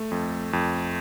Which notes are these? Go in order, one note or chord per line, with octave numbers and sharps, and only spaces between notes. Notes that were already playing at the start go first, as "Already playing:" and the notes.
Already playing: A3
F2
F2